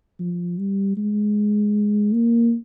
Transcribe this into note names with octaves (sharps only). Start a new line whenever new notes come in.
F3
G3
G#3
A#3